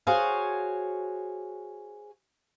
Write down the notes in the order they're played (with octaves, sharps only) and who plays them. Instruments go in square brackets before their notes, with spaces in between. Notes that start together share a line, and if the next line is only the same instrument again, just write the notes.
[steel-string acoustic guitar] F#4 G#4 C5 C#5 F5